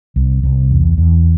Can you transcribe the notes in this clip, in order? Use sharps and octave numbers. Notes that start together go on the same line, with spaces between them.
C2
C2
E2
E2